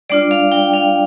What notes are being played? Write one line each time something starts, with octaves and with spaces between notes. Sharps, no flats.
G3 D4 F4 D5
F5
G5
F5